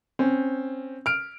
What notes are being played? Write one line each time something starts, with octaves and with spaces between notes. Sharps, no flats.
C4 C#4
F6 D7